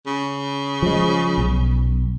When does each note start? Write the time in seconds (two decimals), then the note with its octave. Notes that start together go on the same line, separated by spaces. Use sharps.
0.06 C#3
0.82 F3 G#3
1.38 B1